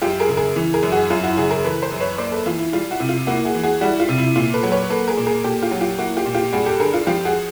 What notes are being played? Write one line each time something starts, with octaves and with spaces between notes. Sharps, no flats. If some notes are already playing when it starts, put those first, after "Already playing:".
F#2 F4 G4
G#4 A#4
C#3
G#4 A#4
E3
G#4 A#4
F#2
F#4 G#4
F#2 F4
E4 F#4
C#3 F#4 G#4
G#4 A#4
E3 A4 B4
A#4 C5
F#2
B4 C#5
A#3 C5 D5
A4 B4
E3 F4
E4
G3 F4
E4 F#4
C3
F4
A#3 E4 F#4
F#4 G#4
E3
F#4 G#4
G3 E4 F#4
F4
C3
E4
A#2 F4
A4 B4
F#3
B4 C#5
A#3 A4 B4
G#4 A#4
A#2
G#4 A#4
A#2 G4 A4
F4 G4
F#3
F4 G4
A#3 E4 F#4
F4 G4
A#2
F4 G4
G2 F#4 G#4
G4 A4
D3 G#4 A#4
F4
F3 F4 G4
F#4 G#4